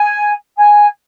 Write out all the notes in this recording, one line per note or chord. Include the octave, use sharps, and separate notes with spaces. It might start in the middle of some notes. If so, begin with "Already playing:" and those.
Already playing: G#5
G#5